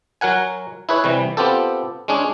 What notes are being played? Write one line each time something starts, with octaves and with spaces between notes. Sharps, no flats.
F#3 A#4 F#5 G#5
E4 G#4 B4 C#5
C3 E3 G3
B3 C4 F4 G4 A4
G#3 C#4 D4 G#4